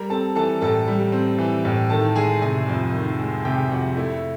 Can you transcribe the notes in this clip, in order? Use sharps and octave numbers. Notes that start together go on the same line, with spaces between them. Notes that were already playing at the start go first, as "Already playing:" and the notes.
Already playing: G3 A#4 A#5
C4 A4 A5
E3 A4 A5
A2 A4 A5
G3
C4
E3
A2
D#3 A4 A5
G#3 G#4 G#5
C3 G#4 G#5
F2
D#3
G#3
C3 G4 G5
F2 F#4 F#5
A3 E4 E5